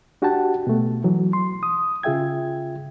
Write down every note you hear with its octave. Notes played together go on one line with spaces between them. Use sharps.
D4 F#4 G4 F#5 G5 A5
B2 A3
E3 F#3
C6
D#6
C#3 F4 G#4 E5 G5 G#6